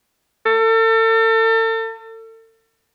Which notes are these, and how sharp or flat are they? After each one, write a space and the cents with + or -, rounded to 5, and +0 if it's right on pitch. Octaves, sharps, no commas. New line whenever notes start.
A4 +35